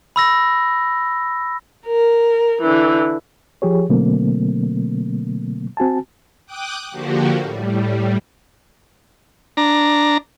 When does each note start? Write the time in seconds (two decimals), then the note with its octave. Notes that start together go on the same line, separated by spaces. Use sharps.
0.16 B5 E6 A#6
1.87 A#4
2.62 D3 E3
3.62 F3 G4 G#4 C#5
3.89 B2 D3 F#3 A3 A#3 C4
5.77 C4 F#4 G#5 A5
6.46 G5 D6 D#6 F#6
6.91 D3 F3 A#3 F#4 G4
7.40 A2 G3
9.57 D4 A#5